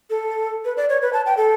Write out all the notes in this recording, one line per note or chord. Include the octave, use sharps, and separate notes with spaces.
A4
B4
D5
C#5
B4
A5
G5
A4